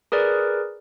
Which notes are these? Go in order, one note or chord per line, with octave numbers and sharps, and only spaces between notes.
G#4 A#4 B4 D5